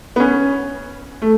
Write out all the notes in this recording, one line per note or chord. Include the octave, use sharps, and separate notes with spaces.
B3
C#4
A3